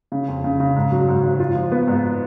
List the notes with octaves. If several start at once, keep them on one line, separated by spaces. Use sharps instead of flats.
C#3
F2
C#3
C#3
G#2
F#3
G#2
G#1
F4
F3
B3
G#2